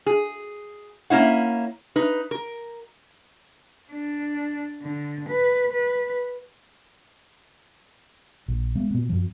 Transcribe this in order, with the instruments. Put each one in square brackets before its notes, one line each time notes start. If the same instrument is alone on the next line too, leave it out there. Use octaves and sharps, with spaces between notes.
[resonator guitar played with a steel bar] G#4
A#3 C#4 E4 F#5
D#4 B4
A#4
[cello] D4
D3
B4
B4
[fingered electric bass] A#1
G#3 B3
A#2 B3
F#2 F3